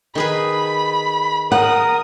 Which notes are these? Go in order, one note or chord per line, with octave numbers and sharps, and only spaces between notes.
D#3 G#4 B4 B5
A#4 F#5 D#6